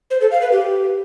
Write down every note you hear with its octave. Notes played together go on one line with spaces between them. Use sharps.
C5
A4
F5
B4
G4